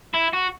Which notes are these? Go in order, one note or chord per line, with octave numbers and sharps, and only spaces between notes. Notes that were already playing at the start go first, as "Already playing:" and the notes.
E4
F#4